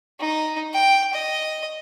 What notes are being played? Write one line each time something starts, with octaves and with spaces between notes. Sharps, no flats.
D#4
G5
D#5